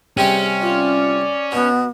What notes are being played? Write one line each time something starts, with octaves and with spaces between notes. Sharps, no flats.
C3 G3 C#4 G4 G#4
F4 D5
B2 B3